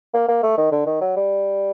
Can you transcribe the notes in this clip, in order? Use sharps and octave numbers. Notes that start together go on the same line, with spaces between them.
A#3
A#3
A3
D#3
D3
D#3
F#3
G3